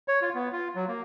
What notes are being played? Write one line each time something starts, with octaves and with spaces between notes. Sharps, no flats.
C#5
F4
B3
F4
F#3
A#3